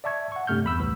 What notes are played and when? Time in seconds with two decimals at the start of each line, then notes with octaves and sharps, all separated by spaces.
0.04 D5 E5 A5 C#6 G#6
0.32 F#5 C#6
0.47 G2 C3 A3 F6 G6
0.64 E2 B5 E6
0.79 C2 A2 E3